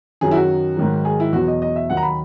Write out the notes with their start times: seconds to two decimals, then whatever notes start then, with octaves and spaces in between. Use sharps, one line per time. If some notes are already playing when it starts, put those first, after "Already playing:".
0.21 F#2 D#3 F#3 G#4
0.31 E4
0.35 F#4
0.77 G#2 D#3 F#3
1.05 G#4
1.20 E4
1.33 E2 B2 F#3 F#4
1.48 D#5
1.62 D#5
1.76 E5
1.89 D#2 D#3 F#3 F#5
1.97 A#5
2.03 B5